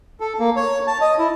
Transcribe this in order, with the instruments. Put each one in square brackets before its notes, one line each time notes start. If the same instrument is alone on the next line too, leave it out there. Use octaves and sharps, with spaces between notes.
[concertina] A4
A#3
C#5
A5
D#5
E4